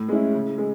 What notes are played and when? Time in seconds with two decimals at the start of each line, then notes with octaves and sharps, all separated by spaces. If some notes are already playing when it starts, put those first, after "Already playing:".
Already playing: A2
0.09 G#3 C#4 E4
0.34 C#3
0.58 G#3